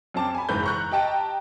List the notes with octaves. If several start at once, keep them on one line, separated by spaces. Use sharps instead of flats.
F#2 C4 A5 D6
G#5 B5
F#1 G#2 E3 B4 B5 G6
A#5 C#6 F#6
G4 D#5 G5 A5 A#5